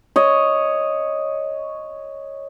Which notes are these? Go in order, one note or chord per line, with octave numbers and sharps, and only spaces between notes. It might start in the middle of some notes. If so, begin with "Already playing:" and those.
C#5 D#5